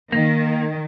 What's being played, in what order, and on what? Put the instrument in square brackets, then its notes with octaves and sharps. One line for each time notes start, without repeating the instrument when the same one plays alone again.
[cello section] D#3 [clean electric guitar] A#3